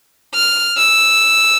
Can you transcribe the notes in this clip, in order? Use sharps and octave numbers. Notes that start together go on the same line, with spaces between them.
F6
E6